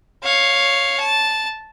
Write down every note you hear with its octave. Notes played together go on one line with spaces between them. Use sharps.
C#5 F5
A5